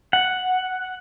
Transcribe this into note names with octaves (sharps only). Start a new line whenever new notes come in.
F#5